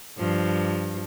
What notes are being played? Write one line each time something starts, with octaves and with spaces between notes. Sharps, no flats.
G2 F3